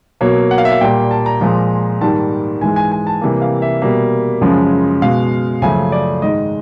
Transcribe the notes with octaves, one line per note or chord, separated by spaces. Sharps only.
B2 F#3 A#3 C#5
F#5
F5
E5
F5
A#2 G3 A#3 G5
A5
A#5
A#2 F3 G#3
G#2 D#3 G3 A#3 A5
G#2 E3 G#3 G#5
G#5
G#5
A5
C3 E3 G3 A#3
F5
E5
B2 G3 A#3
F#2 C#3 F3 G#3
B2 G#3 F5
F#2 C#3 F3 A3 G#5
D5
G#2 D#3 G#3 D#5